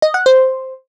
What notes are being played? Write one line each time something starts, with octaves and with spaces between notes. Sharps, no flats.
D#5
F#5
C5